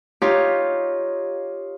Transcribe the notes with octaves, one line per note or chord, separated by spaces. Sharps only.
D#4 F4 G4 C#5